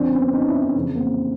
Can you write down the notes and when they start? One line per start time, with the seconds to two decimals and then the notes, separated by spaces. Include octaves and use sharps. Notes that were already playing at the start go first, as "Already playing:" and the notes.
Already playing: F#2 D3 F3 C4 D4
0.12 B3 C#4
0.33 C#4 D#4
0.47 D4 E4
0.61 C#4 D#4
0.76 F2 C#3 E3
0.95 A#3 C4